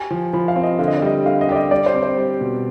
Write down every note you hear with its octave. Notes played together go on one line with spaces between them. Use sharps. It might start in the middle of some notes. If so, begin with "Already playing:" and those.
Already playing: G4 G#5
F3
F3 B5
F5
C4
D#5
D3 F5
D#5
D5
G3 D#5
D3 F5
D#5
G4 D5
D#5
G3 D5
C5
C4
C5
G3
B2